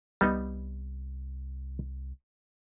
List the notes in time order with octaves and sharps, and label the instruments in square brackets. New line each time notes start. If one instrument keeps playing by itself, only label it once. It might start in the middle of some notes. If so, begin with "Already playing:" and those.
[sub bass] C2 [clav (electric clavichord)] G3 B3 D#4